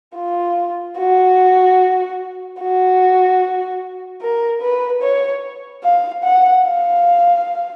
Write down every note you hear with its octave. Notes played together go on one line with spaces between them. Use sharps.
F4
F#4
F#4
A#4
B4
C#5
F5
F#5
F5